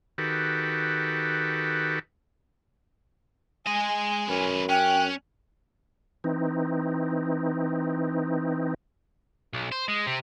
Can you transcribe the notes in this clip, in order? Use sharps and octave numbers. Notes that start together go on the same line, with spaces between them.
D#3 F#4 G4 A4 B4
G#3 D#5 G#5
F#2 C#4 B4
C#4 G5 F#6
E3 C4 D#4
B1
C5
G#3
C3 C4